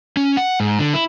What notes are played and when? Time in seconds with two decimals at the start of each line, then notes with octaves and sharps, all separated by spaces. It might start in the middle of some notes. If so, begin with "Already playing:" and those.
0.17 C#4
0.37 F#5
0.60 G#2
0.79 D3
0.94 E4